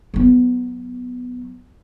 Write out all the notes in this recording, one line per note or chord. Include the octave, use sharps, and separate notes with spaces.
F#3 B3